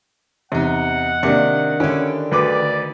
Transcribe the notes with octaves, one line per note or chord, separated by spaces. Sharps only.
E2 C3 D#4 F#5
C3 D#3 A#3 D4 G4
D3 C#4 E4 G4
D2 B4 D5 D6